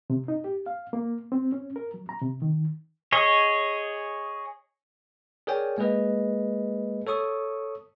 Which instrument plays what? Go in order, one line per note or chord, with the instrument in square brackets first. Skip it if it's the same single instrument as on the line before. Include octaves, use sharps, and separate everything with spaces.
[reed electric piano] C3
D#4
G4
F5
A#3
C4
C#4
A#4
F#3
A#5
C3
D#3
[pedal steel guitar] G#4 C#5 D#5
[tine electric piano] G#4 A#4 C#5 D5 G5 G#5
G#3 A#3 G#4 B4 D#5
A4 C#5 C#6 D#6